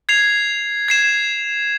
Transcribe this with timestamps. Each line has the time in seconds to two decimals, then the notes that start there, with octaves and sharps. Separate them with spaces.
0.09 G#6 C7 F7
0.88 G#6 C7 E7